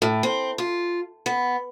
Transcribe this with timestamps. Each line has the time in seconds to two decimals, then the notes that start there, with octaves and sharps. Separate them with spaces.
0.02 A2
0.23 C4
0.58 F4
1.26 B3